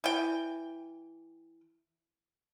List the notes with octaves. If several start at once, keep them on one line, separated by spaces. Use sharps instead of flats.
E3 G5